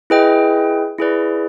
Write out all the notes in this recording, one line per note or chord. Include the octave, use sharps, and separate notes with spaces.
E4 G#4 B4 D#5 G5
E4 G#4 B4 D5